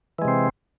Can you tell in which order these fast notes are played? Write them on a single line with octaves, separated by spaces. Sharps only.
E3 G#3 C3 C4